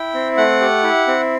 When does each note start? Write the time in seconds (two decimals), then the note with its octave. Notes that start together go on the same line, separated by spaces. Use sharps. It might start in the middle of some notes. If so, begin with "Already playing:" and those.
Already playing: E4 G5
0.14 C4
0.37 A3 F#5
0.61 G4
0.84 E4
1.07 C4